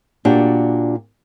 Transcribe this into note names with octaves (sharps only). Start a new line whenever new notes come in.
A#2 D4 F#4 G4